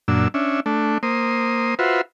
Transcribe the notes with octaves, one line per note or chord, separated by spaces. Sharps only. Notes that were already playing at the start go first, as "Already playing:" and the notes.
F#2 A#2 D4 E6
C#4 D4 E5
A3 D4
A#3 C5 D#6
F4 F#4 B4 C5 E5